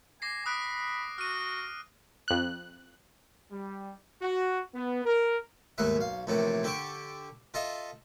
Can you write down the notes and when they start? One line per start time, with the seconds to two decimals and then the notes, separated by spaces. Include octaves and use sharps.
0.22 G#5 D6 A#6 C7
0.46 B5 D#6 F#6 D7
1.18 F#4 F6 D#7
2.28 F2 F#6
3.52 G3
4.22 F#4
4.74 B3
5.05 A#4
5.78 D#2 G#2 A3 B4 E5
5.96 B1 F5
6.27 A#1 A2 C3 E3 D5
6.63 D3 G4 A4 C#6 D6
7.54 F4 A4 D#5 E5